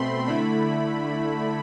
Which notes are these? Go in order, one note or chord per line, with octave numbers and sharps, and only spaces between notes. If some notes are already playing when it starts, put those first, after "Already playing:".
Already playing: B2 A3 C4 B5 C6
D3 A3 E4 B5